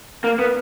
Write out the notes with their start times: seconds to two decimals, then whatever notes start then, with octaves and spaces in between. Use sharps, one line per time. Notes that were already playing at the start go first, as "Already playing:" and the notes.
0.24 A#3
0.39 B3